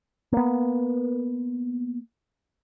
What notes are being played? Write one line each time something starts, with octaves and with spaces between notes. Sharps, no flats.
A#3 B3